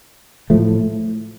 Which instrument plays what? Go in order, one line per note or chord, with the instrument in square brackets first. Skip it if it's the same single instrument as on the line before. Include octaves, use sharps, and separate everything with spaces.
[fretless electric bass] A2 F3 A3